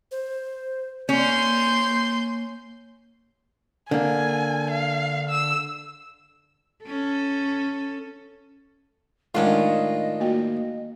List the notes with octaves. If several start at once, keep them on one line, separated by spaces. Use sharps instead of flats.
C5
A#3 C#4 C6 G6
D3 A#3 G#5
F5
E6
C#4 A4
A2 D#3 G#3 C#4 D4 F4 D#5
A#3 F#4 G5